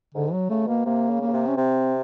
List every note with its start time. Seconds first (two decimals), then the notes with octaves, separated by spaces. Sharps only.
0.15 G#2 D3
0.33 F#3
0.50 C#3 A3
0.67 B2 A#3
0.85 C3 A#3
1.10 C#3
1.21 A#3
1.27 C#3
1.33 C3
1.47 C#4
1.57 C3 C4